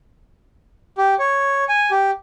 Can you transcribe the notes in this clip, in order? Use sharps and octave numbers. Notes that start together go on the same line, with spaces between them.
G4
C#5
G#5
G4